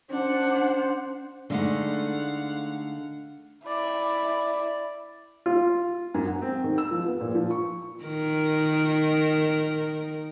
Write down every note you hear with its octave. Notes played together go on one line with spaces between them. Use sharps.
C#4 D4 C5 F#5
D3 G#3 A3 D#4 F5 F#5
E4 D5
F4
F#2
F#5
C4
D#3
E6
F3
B3
A#2
F3
C#6
D#3 A#4